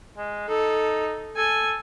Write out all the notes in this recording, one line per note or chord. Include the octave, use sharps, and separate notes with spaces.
G#3
D#4 A4
A4 G#5